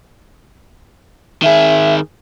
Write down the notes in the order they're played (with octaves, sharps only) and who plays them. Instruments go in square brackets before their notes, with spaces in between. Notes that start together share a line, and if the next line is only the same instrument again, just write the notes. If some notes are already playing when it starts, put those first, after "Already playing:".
[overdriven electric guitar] D#3 G#4 [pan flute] E5